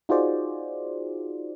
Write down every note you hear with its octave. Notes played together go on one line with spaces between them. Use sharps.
D#4 F4 F#4 G#4 C5 D5